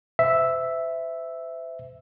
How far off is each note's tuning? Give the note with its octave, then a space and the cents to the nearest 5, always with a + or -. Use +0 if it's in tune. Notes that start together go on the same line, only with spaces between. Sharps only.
C5 -40 E5 +0